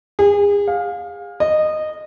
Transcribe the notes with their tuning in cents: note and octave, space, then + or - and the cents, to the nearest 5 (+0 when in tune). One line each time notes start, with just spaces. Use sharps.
G#4 -35
F5 +20
D#5 -15